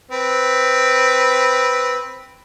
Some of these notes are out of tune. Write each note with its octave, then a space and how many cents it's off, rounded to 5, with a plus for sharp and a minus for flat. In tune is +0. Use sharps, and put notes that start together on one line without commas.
C4 +0 B4 +0